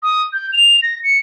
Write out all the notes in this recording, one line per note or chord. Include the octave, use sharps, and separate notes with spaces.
D#6
G6
F7
A#6
C#7